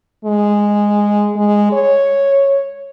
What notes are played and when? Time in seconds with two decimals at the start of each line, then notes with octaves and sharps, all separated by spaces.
0.25 G#3
1.36 G#3
1.72 C#5